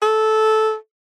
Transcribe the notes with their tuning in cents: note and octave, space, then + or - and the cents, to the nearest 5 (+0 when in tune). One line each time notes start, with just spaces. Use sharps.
A4 -15